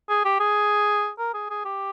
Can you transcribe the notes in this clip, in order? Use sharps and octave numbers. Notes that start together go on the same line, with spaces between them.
G#4
G4
G#4
A#4
G#4
G#4
G4